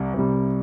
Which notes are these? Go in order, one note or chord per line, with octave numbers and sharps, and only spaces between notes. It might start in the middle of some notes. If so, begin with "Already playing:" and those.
Already playing: C2 C3 G3
C2 C3 G3